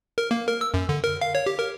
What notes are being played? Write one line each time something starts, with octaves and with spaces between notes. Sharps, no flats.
A#4
A#3
A#4
E6
F#2
D3
A#4
F5
C#5
G4
A#4